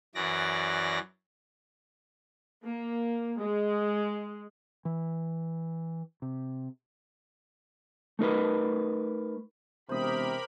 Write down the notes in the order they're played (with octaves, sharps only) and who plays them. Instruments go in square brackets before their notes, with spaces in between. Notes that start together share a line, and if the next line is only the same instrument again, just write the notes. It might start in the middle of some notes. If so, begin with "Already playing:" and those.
[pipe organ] F#2 E3 D5 A#6
[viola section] A#3
G#3
[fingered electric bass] E3
C3
[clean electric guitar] A3 D#4 A#4 B4
[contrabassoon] E1 [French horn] C3 [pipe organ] G4 A#4 B5 [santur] C5 D#5